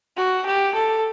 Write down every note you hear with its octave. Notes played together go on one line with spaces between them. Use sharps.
F#4
G4
A4